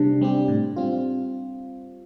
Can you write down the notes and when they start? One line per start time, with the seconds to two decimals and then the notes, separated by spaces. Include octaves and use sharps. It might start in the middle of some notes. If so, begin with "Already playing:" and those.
Already playing: C3 G3 C4 D4 G4
0.21 G3 C4 G4
0.48 A2
0.76 G3 C4 F4